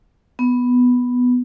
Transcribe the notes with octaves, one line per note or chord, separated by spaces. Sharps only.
B3